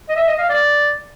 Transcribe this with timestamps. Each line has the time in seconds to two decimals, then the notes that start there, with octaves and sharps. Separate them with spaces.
0.09 D#5
0.16 E5
0.27 D#5
0.38 F5
0.49 D5